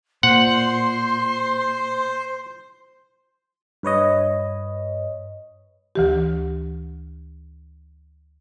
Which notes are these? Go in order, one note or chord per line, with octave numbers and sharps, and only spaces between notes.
A#2 C5 F#5 C6
G2 B4 C#5 D#5
D2 E3 G4